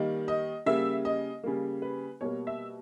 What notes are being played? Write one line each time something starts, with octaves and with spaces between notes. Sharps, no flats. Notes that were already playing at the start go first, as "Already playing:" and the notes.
Already playing: D#3 G3 A#3
D#5
C#3 G3 A#3 E5
D#5
C#3 G3 A#3
B4
B2 G3 A#3 C#5
E5